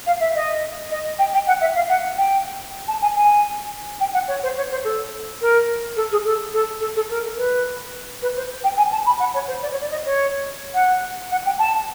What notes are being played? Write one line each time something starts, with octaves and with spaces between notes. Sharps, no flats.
F5
E5
D#5
D#5
G5
G5
F#5
E5
F5
F#5
G5
A5
G#5
G#5
G5
F#5
C#5
C5
C#5
C5
A4
A#4
A4
G#4
A4
A4
A4
A4
A#4
B4
B4
C5
G5
G#5
A5
B5
F#5
C#5
C5
D5
C#5
D5
D#5
C#5
F#5
F#5
G5
A5